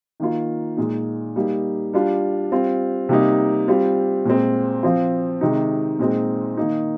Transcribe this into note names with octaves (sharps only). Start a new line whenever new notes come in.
D#3 A#3 F4
A#2 G#3 D#4
G3 A#3 D#4
G3 D4 F4
G3 C4 F4
C3 G3 A#3 D#4
G3 C4 F4
A#2 G#3 C4
F3 C4 F4
C3 D#3 G#3 D#4
A#2 G#3 C4 D#4
D#3 A#3 D#4